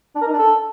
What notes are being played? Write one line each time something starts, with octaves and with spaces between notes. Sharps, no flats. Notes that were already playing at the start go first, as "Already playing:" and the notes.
D4
A#4
D#4
D4
A4